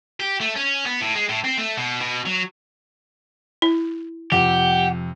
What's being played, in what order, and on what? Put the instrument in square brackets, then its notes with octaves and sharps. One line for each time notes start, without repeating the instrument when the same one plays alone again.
[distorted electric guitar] G4
A3
C#4
B3
A2
G#3
A2
C4
A3
B2
B2
F#3
[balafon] E4
[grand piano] F2 C3 [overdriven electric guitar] G4 [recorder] F#5